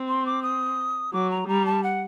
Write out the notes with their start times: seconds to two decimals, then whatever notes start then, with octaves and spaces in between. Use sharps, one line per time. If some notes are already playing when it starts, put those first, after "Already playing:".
Already playing: C4
0.09 C6
0.26 D6
0.43 D#6
1.13 F#3 D6
1.30 A#5
1.48 G3 A#5
1.66 A5
1.83 F#5